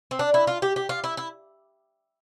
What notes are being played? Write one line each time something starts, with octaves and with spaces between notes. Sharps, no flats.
C4
D4
E4
F4
G4
G4
F4
E4
E4